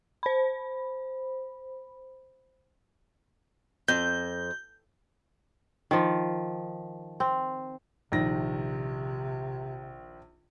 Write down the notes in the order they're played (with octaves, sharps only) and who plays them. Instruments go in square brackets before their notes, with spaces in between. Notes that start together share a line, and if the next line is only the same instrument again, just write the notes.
[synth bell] C5 B5
[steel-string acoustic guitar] F2 [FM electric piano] G6
[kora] D#3 F3
C4
[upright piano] A#1 D#3 A#6 [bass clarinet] C3